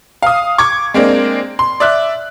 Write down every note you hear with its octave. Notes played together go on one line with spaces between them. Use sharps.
F5 D#6
C#6 D6 G#6
G#3 A#3 C4 D4
C6
D5 E5 F#6